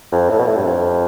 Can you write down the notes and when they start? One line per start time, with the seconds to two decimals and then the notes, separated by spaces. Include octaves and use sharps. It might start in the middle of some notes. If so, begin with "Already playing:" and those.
0.12 F2
0.29 A2
0.38 B2
0.47 A2
0.57 G2
0.65 F2